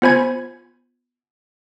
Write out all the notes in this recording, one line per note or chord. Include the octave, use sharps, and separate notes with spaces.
B3 F4 C5 G#5 B5 G#6